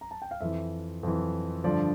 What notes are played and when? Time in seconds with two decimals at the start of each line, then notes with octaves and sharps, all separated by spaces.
0.01 A#5
0.11 A5
0.22 G5
0.31 F5
0.41 F2 E3 E5
1.03 F2 E3
1.64 G2 D3 F3 D5